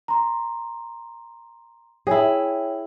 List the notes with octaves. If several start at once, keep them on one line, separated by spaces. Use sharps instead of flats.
A#5 C6
E4 G#4 C#5 G5